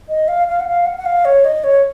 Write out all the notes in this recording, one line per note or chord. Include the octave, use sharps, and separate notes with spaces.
D#5
F5
F5
F#5
F5
F#5
F#5
F5
C#5
D#5
C#5